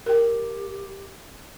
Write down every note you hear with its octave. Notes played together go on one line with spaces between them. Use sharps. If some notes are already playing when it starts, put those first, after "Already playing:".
G4 A#4 G5